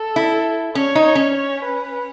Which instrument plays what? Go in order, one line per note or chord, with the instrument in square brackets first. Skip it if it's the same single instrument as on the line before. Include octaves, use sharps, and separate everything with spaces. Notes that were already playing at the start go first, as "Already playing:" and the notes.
Already playing: [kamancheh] A4
[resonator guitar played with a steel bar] E4
[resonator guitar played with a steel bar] C#4 [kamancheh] C#5
[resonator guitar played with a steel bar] D#4
[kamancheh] C#5
[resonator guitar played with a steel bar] C#4
[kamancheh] C#5
B4